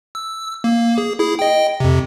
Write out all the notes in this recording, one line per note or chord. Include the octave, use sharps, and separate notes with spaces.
E6
A#3
G#4
E4 G#4
D#5 G5
F2 C3